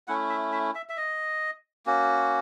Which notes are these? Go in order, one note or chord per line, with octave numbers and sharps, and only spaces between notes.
A3 C#4 E4 F#5
E5
E5
E5
E5
D#5
A#3 C#4 F#4